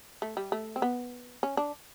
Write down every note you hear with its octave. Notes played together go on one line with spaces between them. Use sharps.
A3
G3
A3
C4
B3
C#4
D4